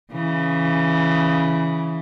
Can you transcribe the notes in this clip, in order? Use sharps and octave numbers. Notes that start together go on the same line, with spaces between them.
C#3 E3